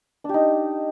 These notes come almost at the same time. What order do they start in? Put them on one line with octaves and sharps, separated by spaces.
D4 G4 D#4